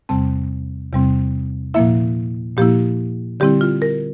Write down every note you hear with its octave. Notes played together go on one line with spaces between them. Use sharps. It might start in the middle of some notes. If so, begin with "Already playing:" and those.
E2 C3 G3 C4 A5
E2 C3 G3 C4
A#2 F3 A#3 E4 E5
A#2 F3 A#3 E4 G4
D3 G3 C4 E4 G4
F4
A#4